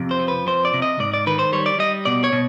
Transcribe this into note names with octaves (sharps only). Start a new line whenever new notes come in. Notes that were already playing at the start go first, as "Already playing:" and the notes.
Already playing: F2 C3
C5
F3
B4
F2 C5
D5
C3
D#5
G#2 D5
D5
D#3 B4
C5
G3 C#5
D5
G3 D#5
B2 D5
C#5
B2